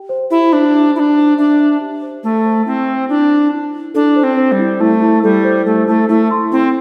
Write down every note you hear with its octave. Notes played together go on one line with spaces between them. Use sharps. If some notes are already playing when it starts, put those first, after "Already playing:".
Already playing: G4 G5
C5
E4 G4
D4 C5
G4
D4 E4 C5
C5
D4 E5
E5
G4
C5
A3 A4
C5
C4 E4
C5
D4 E4
E4
E4
E4
D4 A4
C5
C4
C5
G3
E4
A3 E4
E4
G3 A4
C5
A3 A4
A3 E4
A3 E4
C6
C4 E4